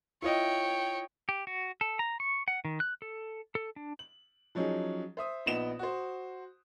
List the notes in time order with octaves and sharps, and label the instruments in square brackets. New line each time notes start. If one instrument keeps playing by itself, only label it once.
[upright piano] E4 F4 D#5 [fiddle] C#5 G5
[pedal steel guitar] G4
F#4
A4
A#5
C#6
F#5
D#3
F#6
A4
A4
D4
[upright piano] F#7
F3 F#3 C#4 D#4 G#4
C5 E5 D#6
A#1 B3 D#4 E7 G7
F#4 C5